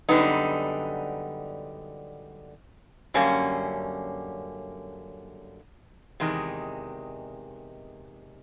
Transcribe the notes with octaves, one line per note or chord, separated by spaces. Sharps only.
F#2 D3 G3 B3 D#4
F#2 D3 G3 A#3 C#4
E2 C3 D#3 G#3